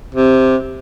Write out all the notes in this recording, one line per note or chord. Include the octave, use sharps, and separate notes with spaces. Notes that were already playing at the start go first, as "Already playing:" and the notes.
C3